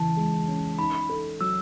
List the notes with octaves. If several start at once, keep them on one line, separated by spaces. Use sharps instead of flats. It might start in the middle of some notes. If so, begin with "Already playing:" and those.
Already playing: C#3 E3 A5
G#3
C#4
D#4 B5
A4
F#3 E6